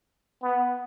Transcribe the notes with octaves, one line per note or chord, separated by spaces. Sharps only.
B3